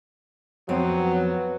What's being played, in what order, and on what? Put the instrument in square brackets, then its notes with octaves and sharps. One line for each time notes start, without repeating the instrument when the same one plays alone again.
[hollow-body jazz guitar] F2 C4 [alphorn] F#3 [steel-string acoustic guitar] B3